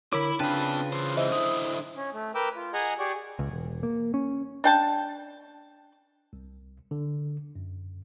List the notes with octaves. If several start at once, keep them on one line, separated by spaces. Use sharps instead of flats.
D3 E4 A#4 C#5 B5 D6
C#3 C4 D4 F4 B4 G5 A5
E3 C5
C#2 E3 C5 D#5 E5
D3 E4 D#6
C#4
A3
A#4 B4 G5 D6 E6
F4
G#4 D#5 F#5 G#5 A#5
G4 G#4 D5 C#6
C#2
E1
A#3
C#4
D4 G5 A5
C2
D3
F#2